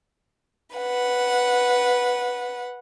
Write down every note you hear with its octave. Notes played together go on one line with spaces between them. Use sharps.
B4 F#5